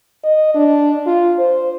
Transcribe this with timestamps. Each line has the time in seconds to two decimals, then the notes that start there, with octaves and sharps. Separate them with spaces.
0.24 D#5
0.55 D4
1.06 F4
1.39 C5